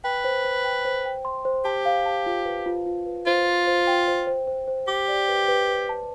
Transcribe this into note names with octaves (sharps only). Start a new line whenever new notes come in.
B4 G5
C5
C5
G5
C5
G5
C6
C5
G4 A5
F5
A5
F4
B4
F4
F4
B4
F4 C5
C5
C5
G5
C5
C5
C5
C5
G4 D6
D5
B4
B4
B4
A5